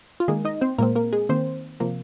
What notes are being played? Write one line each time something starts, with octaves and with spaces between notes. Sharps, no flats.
F4
D#3 G#3 A#3 G#4
D#4 D#5
C4 C5
A#2 G#3 A#3 C4 A#4
A#3 A#4
G#3 G#4
D#3 A#3 C4 C5
C3 F3 A#3